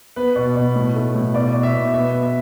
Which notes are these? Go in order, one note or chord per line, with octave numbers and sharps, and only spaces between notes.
B3 B4
B2
B2
A2
A3
A2
B2 D5
B2
E5
B2
B3 E5
B3
E5